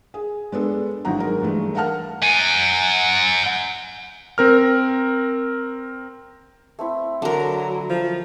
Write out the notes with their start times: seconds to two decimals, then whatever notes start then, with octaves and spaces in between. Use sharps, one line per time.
0.14 G#4
0.52 G#3 B3 D4 A4
1.05 G#1 D3 F#3 E4 F#5 A#5
1.19 D#3 G#3 A#4
1.41 G2 E3 G#3 A3
1.75 A#4 F5 F#5 A5 F6
2.23 F#5 G#5
4.38 C4 A#4 F6
6.79 A3 C4 E4
7.22 D3 F#3 A#4
7.90 F3